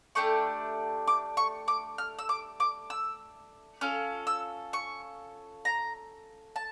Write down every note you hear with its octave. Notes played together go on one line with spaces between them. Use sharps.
A3 D4 G4 C#6
D6
C#6
D6
F6
E6
D6
D6
E6
C#4 F4 A4 F6
E6
C#6
A#5
A5